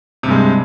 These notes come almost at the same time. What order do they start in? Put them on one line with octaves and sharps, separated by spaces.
C3 G2 G3 G#3